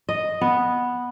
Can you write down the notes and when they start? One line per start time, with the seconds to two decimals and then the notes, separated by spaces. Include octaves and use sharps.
0.09 D#5
0.41 B3